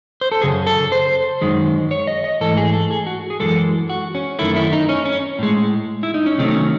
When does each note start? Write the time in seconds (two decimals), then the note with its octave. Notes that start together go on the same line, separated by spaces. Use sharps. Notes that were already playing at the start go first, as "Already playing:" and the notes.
0.21 C5
0.32 A4
0.42 F#2 C#3 G#4
0.67 A4
0.92 C5
1.41 F#2 D#3 G#3
1.91 C#5
2.07 D#5
2.24 D#5
2.41 G#2 E3 A3 A4
2.57 G#4
2.74 A4
2.91 G#4
3.07 F#4
3.30 G#4
3.40 F#2 C#3 E3 G#3 A4
3.90 F#4
4.15 C#4
4.39 F#2 D#3 A3 E4
4.56 E4
4.73 D#4
4.89 C#4
5.05 C#4
5.39 A2 G#3
6.03 E4
6.14 D#4
6.26 C#4
6.38 C3 D#3 F#3 A3 C4
6.48 D#4
6.55 C#4